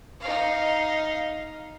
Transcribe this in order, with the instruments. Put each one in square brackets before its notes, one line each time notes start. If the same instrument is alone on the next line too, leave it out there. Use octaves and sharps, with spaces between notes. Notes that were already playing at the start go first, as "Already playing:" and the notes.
[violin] D#4 F5